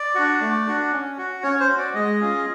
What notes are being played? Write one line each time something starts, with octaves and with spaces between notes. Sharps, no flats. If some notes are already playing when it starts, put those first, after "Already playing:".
Already playing: D5
D4 F#4
A3
D4 F#4
C#4
F#4
C#4 C#5
C5
F#4
D5
G#3 D#5
C#4 F4 G#4